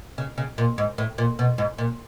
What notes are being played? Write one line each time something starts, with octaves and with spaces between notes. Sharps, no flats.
C#3
C#3
A#2
G#2
A2
A#2
B2
G#2
A#2